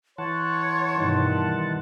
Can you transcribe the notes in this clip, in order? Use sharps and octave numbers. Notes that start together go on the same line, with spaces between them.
E3 C#5 F#5 A5 C6
G2 B2 D#3